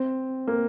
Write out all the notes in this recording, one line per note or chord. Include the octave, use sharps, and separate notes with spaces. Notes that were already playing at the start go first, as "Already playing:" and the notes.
Already playing: C4
A#3